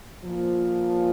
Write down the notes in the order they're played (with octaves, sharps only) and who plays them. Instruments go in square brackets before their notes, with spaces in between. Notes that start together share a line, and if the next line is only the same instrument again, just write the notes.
[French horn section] A#2 F3